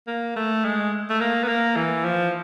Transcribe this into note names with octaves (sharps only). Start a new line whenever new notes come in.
A#3
A3
G#3
A3
A#3
B3
A#3
E3
F3